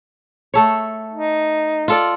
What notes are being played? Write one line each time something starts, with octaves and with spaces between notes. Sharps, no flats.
A3 A4 C#5
D#4
F4 A4 D5